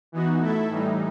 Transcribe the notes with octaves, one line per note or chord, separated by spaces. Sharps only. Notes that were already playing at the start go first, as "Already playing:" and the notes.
E3 B3 D#4 F#4
A3 E4 A4 E5
A2 E3 G3 D#4